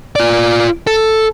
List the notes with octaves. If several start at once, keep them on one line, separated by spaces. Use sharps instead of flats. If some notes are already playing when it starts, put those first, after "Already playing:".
F4 D5
A4